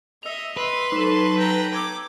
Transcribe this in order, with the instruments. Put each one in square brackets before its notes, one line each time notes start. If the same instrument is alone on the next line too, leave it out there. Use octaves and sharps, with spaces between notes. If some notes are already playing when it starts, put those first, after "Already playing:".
[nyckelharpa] D#5 E5 [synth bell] E6 F7
[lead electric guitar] B4 [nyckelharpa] C6
[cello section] F#3 A4 [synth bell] D#4 E7
[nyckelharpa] G5 A#5
[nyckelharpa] D6 [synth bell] E6 G#6